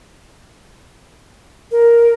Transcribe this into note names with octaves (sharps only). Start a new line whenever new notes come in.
A#4